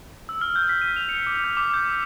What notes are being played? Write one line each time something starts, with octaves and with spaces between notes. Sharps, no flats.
E6
F6
G6
B6
D#7
F7
C#7
D6
G6
D6
G6
E6